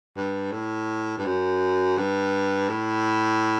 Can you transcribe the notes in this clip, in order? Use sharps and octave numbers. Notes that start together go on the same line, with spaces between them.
G2
A2
G2
F#2
G2
A2